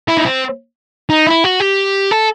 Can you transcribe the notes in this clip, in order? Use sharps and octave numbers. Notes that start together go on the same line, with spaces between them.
E4
D#4
C4
D#4
E4
F#4
G4
A4